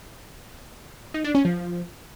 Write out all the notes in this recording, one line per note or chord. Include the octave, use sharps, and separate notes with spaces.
D#4
D4
C#4
F3